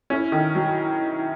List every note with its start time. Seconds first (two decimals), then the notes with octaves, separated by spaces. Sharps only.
0.10 C#4 E4
0.32 D#3
0.55 F#3